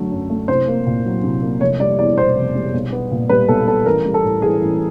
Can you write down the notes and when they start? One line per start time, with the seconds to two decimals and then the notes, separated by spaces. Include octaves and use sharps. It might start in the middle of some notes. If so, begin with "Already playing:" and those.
Already playing: F#2 D3 F#3 A3
0.11 F#2
0.30 A3
0.48 C2 C5
0.68 A#3
0.86 A#2
1.05 F#3
1.23 C2
1.42 A#3
1.61 F1 C#5
1.80 G3 D5
1.98 E2 D5
2.17 B2 C5
2.36 F1
2.55 G3
2.74 B1
2.92 B3
3.11 A#2
3.29 G3 B4
3.48 B1 A4
3.67 B3 A4
3.86 A1 A#4
4.05 G3
4.14 A4
4.24 A2
4.42 E3 G#4
4.61 A1